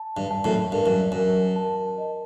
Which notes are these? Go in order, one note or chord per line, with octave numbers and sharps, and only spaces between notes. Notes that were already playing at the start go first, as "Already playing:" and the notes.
Already playing: A5
G2
A5
F#2 A2
G2 A#4
F#2
F#2 A#4
A5
D#5